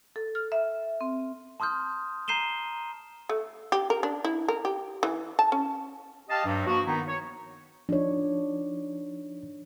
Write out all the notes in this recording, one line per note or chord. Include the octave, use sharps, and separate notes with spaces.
A4
F6
E5
C4
A5 C6 D#6 F6 G6
A#5 G6 C7 D#7 E7 G7
A3
G4
A#4
D4
E4
A#4
G4
E3
A5
C#4
G4 D#5 F5 A5
G2 F#3
F3 A#3 F#4
D#3 B3 D#4 E4
C#5
F3 D4 D#4 C#5